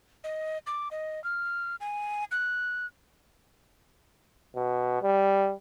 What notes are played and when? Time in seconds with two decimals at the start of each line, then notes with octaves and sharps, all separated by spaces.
0.24 D#5
0.67 D6
0.91 D#5
1.24 F6
1.80 G#5
2.31 F#6
4.56 B2
5.02 G3